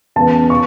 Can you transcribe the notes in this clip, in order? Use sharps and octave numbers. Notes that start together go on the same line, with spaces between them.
E2 C#3 E3 B3 A5
C#6